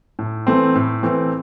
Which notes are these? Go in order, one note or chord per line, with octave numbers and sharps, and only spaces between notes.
A2
E3 A3 C4
A2
E3 A3 C4